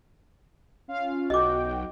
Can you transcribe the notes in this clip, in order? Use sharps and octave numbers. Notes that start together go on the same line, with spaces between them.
C#4 F4 F5
B1 F#4 D#5 G5 D6